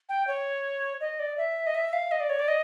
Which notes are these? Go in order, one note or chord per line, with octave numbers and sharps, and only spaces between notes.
G5
C#5
D#5
D5
E5
D#5
E5
F5
D#5
D5
C#5
D5
D#5